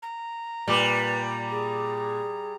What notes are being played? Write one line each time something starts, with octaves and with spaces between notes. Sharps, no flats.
A#5
A#2 G3 B4 D6
G#4